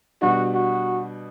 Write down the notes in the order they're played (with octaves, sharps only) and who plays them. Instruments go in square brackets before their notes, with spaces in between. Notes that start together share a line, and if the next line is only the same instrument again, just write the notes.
[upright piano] B2 G3 D4 [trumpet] F#4
[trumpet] F#4